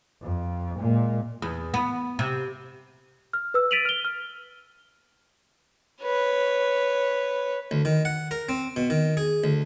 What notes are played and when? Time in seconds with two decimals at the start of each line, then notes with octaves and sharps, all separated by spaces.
0.22 F2
0.79 A#2 G#3
1.42 E2
1.74 B3
2.19 C3
3.33 F6
3.54 B4 E6
3.71 A6 B6 D7 D#7 F7 F#7
3.85 F6 G7
4.05 F6
6.03 B4 C#5
7.71 D2
7.85 D#3
8.05 F#5
8.31 A#4
8.49 C4
8.76 B2
8.90 D#3
9.17 G#4
9.44 D2